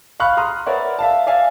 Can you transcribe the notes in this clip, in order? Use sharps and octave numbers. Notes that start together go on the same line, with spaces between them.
F5 B5 C#6 F6 F#6
A#5 C6 D#6 F6
A#4 B4 C#5 D5 E5 F#5
E5 F5 A5
D5 E5 F5 G#5